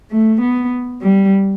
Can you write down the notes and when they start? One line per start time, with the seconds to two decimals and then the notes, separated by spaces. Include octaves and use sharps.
0.11 A3
0.41 B3
1.02 G3